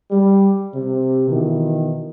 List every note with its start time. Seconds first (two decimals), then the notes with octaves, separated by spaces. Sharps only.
0.11 G3
0.74 C3
1.29 B2 D#3 E3